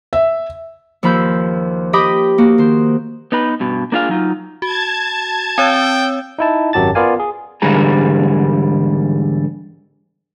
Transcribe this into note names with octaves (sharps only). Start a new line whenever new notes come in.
E5
D#2 F3 F4 B5 E6 G6
G4 D#5 G5 B5 D6 D#6
A#3 F#4
D#3 C5
B3 D#4 B4
G2 B2
A#3 D4 F4 G#4 F5
F#3 D#4 F4
F#4 A5 G#6
C4 C#5 G5 E6
D#4 E4 A5
G#1 F#2 F#3 G4 A5 A6
B3 F4 A#4 D5 F5 G#5
G#4
E2 G#2 D3 G3 G#4 A#5